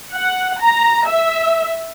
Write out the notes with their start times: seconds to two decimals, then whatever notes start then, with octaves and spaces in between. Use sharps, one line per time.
0.14 F#5
0.61 A#5
1.08 E5